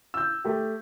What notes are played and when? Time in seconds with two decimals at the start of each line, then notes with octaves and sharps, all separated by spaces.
0.14 E6 G6
0.44 A3 G4